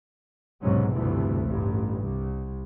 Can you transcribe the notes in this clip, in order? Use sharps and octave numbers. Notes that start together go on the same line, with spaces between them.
B1 E2 G#2 C3 F#3 C#4
F1 D2 G2 C3 E3 A3
A1 G2
C2